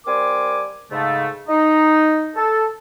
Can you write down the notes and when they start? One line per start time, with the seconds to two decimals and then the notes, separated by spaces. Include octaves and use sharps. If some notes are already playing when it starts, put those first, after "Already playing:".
0.07 G3 C4 A#4 G#5 D6
0.92 G#2 C#3 A3
1.49 D#4
2.36 A4